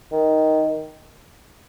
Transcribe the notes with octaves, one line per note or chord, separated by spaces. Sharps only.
D#3